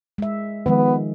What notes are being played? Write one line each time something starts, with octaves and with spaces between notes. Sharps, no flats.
G#3 E5
D#3 F3 G#3 B3